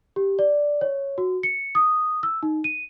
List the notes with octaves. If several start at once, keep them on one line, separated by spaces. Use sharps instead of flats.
G4
D5
C#5
F#4
C#7
D#6
E6
D#4
D#7